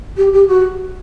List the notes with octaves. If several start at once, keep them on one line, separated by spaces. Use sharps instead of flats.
G4
G4
F#4